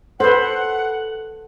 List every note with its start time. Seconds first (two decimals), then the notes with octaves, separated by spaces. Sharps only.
0.20 A4 B4 C5 F#5